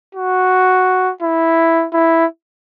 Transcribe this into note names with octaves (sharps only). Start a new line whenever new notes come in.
F#4
E4
E4